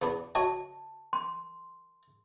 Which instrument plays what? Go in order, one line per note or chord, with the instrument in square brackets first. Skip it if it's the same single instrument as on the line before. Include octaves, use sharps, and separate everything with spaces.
[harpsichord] E2 B3 D4
[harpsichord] F#4 C#5 D#5 [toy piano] A5
[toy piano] C6